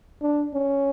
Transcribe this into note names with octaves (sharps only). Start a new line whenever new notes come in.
D4
C#4